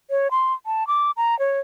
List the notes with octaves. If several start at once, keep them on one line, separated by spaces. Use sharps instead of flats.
C#5
C6
A5
D6
A#5
C#5